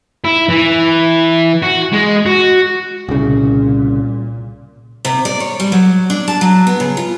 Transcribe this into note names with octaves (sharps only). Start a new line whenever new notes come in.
E4
E3
F#4
G#3
F#4
C2 A#2 C#3
C3
D5
C#5
G3
F#3
D4
A5
F#3
B3
C#3
F4